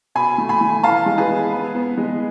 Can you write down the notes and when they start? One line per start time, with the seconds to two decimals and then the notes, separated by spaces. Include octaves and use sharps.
0.15 B2 G#5 B5
0.38 A3
0.49 G#5 B5
0.61 A3
0.83 E3 F5 A5
1.06 G#3
1.18 G#4 B4
1.29 B3
1.52 B3
1.75 B3
1.98 G#3